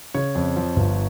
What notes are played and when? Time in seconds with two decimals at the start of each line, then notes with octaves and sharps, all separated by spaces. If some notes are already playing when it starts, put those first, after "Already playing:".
0.14 C#3 C#5
0.35 F2
0.56 F3
0.76 G1